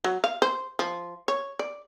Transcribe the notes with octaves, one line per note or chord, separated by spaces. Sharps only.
F#3
F5
C5
F3
C#5
D5